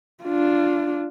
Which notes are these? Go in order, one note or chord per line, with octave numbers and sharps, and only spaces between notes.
D4 F4